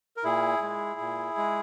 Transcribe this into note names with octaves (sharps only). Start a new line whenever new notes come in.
A#4
A#2 E4 G#4
G#3
A#2
G#3